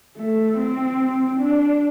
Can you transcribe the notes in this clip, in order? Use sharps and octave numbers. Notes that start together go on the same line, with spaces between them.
A3
C4
D4